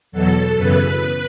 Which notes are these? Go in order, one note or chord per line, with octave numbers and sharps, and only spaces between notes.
E2 B2 F#3 A4
F#2 C#3 E3 B3 B4